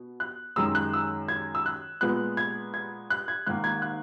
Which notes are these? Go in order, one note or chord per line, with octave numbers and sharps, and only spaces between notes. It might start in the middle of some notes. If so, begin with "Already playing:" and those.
Already playing: B2
F#6
F#2 D#3 G#3 E6
F#6
E6
G#6
E6
F#6
A#2 G#3 B3 F#6
G#6
G#6
F#6
G#6
G#2 D#3 A#3 F#6
G#6
F#6